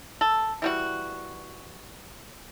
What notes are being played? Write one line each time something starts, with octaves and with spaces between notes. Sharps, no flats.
A4
E3 G3 F#4